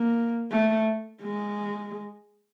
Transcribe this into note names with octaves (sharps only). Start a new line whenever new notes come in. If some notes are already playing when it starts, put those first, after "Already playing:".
Already playing: A#3
A3
G#3